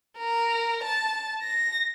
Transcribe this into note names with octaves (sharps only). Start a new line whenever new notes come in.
A#4
A5
A#6